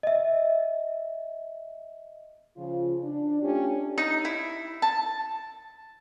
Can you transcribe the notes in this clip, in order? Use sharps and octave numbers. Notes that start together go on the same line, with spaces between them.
D#5 E5
C#3 F3 F4
D4
A3 C#4 D4 F4 G4
D#4
E4
A5